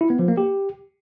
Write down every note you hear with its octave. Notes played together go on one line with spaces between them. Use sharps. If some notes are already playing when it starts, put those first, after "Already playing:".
E4
B3
F3
A#3
G4